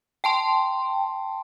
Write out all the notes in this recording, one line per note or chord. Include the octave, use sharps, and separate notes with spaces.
G5 A5 C6